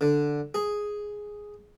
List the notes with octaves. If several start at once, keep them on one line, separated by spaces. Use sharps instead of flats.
D3
G#4